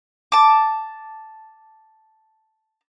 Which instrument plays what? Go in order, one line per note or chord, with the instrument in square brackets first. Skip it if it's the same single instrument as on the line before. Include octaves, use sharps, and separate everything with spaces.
[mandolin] A5 D6